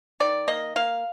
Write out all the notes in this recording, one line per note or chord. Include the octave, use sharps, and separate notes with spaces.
D#3 D5
A#3 D#5
A#3 F5